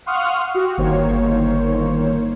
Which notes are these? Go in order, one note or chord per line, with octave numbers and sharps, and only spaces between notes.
F5 F#5 C6 C#6 D#6 F6
F#4 G4
G1 D#3 A#3 C5 C#5